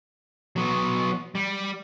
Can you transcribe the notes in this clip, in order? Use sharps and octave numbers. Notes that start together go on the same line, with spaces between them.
F#3 B3
G3